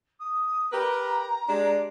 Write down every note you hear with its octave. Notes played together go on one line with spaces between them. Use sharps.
D#6
G4 A#4 B4 A#5
G#3 D4 G4